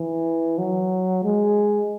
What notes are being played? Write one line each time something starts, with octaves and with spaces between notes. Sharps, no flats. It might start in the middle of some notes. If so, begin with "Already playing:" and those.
Already playing: E3
F#3
G#3